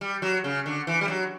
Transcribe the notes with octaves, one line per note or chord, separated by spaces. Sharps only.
G3
F#3
C#3
D3
E3
G3
F#3